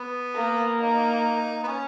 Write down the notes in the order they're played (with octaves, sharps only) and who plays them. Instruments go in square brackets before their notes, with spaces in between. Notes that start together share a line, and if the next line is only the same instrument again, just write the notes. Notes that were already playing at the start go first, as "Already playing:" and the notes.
Already playing: [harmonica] B3
[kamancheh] A#3
[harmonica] D#4
B3
C#4